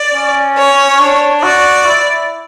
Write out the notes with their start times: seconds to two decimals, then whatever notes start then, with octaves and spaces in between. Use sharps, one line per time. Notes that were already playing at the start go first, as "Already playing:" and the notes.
Already playing: D5
0.14 C#4
0.58 C#5
0.99 D4
1.42 F#4 D5
1.86 E4